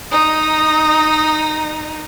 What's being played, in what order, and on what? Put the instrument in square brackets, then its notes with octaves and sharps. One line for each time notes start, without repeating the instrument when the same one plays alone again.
[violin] D#4 [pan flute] D#6